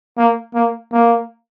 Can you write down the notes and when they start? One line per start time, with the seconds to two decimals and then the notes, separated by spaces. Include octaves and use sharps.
0.18 A#3
0.55 A#3
0.93 A#3